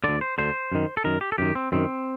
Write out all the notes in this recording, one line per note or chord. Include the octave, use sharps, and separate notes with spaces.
D2 D3 D5
C5
D2 D3 C5
F#2 D#3
A4
F#2 D#3 A#4
G4
A4
F#2 D#3 G4
C4
F#2 D#3 C4